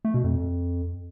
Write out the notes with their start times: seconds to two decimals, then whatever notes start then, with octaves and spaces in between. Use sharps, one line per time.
0.05 A3
0.14 B2
0.24 F2